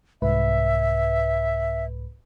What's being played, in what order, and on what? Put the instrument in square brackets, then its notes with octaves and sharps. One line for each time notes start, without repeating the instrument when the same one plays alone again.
[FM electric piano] C2 G#2 B4 [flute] E5